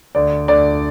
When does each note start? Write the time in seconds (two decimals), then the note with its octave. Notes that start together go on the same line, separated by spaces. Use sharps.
0.15 D2 D5
0.48 D2 D5